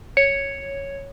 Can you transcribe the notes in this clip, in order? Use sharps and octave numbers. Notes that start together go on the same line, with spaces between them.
C#5 C#7